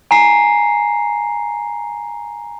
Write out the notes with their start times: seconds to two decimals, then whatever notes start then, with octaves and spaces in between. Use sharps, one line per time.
0.11 G#5 A#5 C7